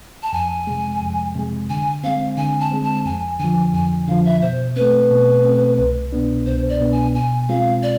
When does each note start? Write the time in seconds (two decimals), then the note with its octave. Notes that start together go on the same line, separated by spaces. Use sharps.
0.23 A5
0.33 F2 G#5
0.67 C3 G#3
1.01 F2
1.35 C3 G#3
1.69 D3 G#5
2.04 G#3 C4 F5
2.37 D3 G#5
2.60 A5
2.72 G#3 C4
2.83 A5
3.06 F2 G#5
3.40 D3 F3 G#5
3.74 F2 G#5
4.08 D3 F3 F5
4.25 E5
4.42 B2 C5
4.76 A3 C4 B4
5.11 B2
5.44 A3 C4
5.79 C2
6.12 B2 B3 D4
6.46 C2 C5
6.69 D5
6.81 B2 B3 D4
6.92 G#5
7.15 B2 G#5
7.49 G#3 C4 F4 F5
7.83 D5